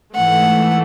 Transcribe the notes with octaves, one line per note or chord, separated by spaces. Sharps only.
G#2 E3 A3 F#5